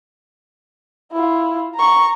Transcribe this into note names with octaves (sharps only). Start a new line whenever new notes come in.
E4 F4
A#5 C#6